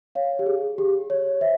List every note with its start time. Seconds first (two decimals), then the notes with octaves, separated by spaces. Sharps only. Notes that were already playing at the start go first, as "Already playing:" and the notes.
0.15 C#5 F5
0.39 G4
0.46 G#4
0.78 G4
1.10 C#5
1.41 C5 E5